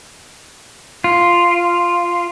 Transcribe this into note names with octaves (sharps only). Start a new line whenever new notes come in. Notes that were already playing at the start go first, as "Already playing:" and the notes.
F4